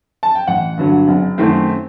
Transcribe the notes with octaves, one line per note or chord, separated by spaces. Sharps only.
A5
G5
A1 F#5
G2 D3 F#3
F#1
F#2 D#3 A3 C4